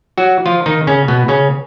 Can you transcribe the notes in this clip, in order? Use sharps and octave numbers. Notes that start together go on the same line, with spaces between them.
F#3 F#4
F3 F4
D#3 D#4
C#3 C#4
B2 B3
C#3 C#4